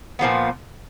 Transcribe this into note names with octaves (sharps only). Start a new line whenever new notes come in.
A#2 F3 G#3 B3